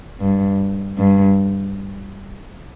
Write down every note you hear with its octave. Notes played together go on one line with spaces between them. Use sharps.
G2
G2